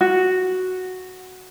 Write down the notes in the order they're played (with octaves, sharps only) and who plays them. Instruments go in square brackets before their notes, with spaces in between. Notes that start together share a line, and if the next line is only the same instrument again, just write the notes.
[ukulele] F#4